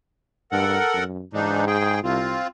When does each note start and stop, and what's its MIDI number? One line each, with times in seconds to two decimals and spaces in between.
0.52 0.78 43
0.52 1.04 69
0.52 1.04 70
0.52 1.04 78
0.94 1.23 42
1.33 1.99 44
1.33 1.65 52
1.33 1.65 62
1.33 1.65 63
1.67 2.00 68
1.67 2.00 79
2.04 2.38 36
2.04 2.47 60
2.04 2.47 65